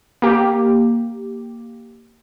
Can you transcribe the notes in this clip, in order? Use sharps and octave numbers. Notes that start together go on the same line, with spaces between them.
A#3 G4